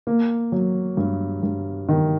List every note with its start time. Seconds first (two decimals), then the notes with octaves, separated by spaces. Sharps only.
0.07 A#3
0.52 F#3
0.97 G2
1.43 G2
1.89 D#3